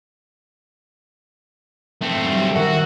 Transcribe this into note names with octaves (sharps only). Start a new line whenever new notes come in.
A3 C4
F#3 G3
D#3 F#4 A#4 E5